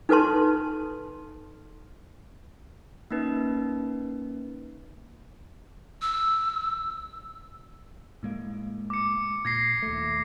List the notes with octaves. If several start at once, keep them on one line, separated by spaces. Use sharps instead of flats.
D#4 A4 B4 A5 C6
A#3 C#4 D#4 B4
E6
A2 G#3 A#3
D6 C#7
A#2 G#6 A#6 C7
D#2 A3